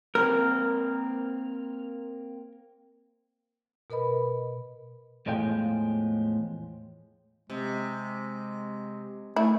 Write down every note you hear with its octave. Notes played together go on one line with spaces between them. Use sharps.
A#3 C4 A#4 F6
B2 A#4 B4 D#5 B5
E2 A2 F3 G#3 F5 G5
C3 G#3
A3 E4